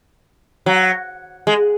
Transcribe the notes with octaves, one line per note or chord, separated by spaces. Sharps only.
F#3
G#3